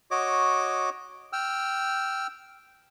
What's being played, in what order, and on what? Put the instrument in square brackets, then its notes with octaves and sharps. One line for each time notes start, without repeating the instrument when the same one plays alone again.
[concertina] F#4 C#5 D#5 D6
G5 E6 F6